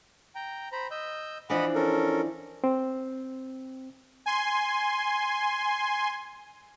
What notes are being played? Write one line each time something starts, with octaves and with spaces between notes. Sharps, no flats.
G5 A#5
C5 A#5 B5
D#5 E6 G6
E3 F3 D4 D#5 F#5 B5
C#4 A4 A#4
C4
G#5 C6